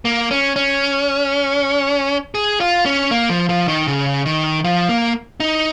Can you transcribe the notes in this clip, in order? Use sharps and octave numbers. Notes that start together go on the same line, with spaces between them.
A#3
C#4
C#4
G#4
F4
C#4
A#3
F3
F3
D#3
C#3
D#3
F3
A#3
D#4